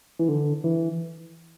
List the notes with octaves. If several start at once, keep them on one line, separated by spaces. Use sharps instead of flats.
E3
D3
E3